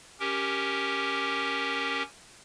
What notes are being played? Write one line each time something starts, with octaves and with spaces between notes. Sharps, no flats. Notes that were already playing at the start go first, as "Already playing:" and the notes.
C#4 G4 A#4